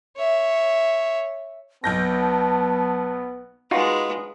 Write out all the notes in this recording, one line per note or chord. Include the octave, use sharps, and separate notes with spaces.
C#5 E5
B1 B3 A5 G6 A#6
G#3 D#4 F4 F#4 B4